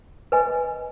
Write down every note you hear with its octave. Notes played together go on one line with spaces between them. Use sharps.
B4 D#5 G#5 B5